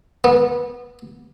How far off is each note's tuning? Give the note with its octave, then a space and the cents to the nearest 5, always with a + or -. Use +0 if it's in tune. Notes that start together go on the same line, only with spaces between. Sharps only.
B3 -25